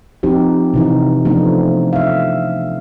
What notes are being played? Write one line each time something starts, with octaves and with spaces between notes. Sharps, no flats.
F3 C4 D#4 G4
C3 E3 D#4
F3 A3 B3 D4 D#4
E5 F5